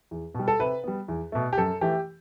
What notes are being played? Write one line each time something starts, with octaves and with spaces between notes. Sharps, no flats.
E2
B2 G3
A4
C3 B4
G3 B3
E2
B2 A3
G4
F#2 A4
E3 A3 G4